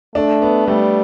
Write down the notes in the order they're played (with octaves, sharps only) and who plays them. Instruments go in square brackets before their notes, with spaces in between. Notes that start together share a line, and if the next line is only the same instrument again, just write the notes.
[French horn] A3 [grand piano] D4
[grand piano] B3
[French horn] G3 [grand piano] A3